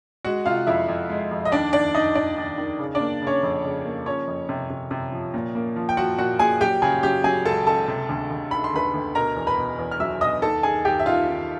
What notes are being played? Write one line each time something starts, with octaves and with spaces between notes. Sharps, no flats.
G#3 F#4 F#5
C3 F4 F5
F2 E4 E5
F2
G#3
F2
D#5
D#2 D4 D5
D#2 D4 D5
D#2 D#4 D#5
D#2 D4 D5
D#2
D#3
C#3
D4 D5
A#3
C#3
C#4 C#5
F2
C#3
A#3
F3 C#4 C#5
F2
C3
C3
C3
F3
A#2
A#3
F3
G5
F3 F#4 F#5
A#2 F#4 F#5
A#2 G#4 G#5
F#3 G4 G5
C#3 G#4 G#5
F#3 G4 G5
F#3 G#4 G#5
C#2 A4 A5
C#2 A4 A5
C3
D2
D2
D#3 B5
C6
D2 B4 B5
D2
B2 A#4 A#5
E2
B4 B5
B2
E2
F6
F#3 E5 E6
B2 D#5 D#6
D#2 A4 A5
D#3 G#4 G#5
D#2 G4 G5
E5
D#3 F4 F5
D#3